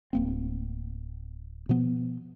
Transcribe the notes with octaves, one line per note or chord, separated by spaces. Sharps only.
D1 A#3 C4
B2 F3 B3